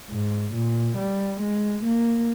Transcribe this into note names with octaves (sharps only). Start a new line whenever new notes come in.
G#2
A#2
G3
G#3
A#3